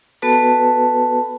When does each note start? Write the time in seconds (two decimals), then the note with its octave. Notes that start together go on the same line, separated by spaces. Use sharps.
0.22 B3 F#4 A4 B4 A5